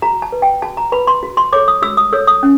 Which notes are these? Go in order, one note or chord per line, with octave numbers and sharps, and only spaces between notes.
F#4 A#5
A5
B4
G5
F#4 A5
A#5
B4 B5
C6
F#4
C6
A4 C#5 D6
D#6
F#4 E6
D#6
A4 C#5 E6
D#6
C#4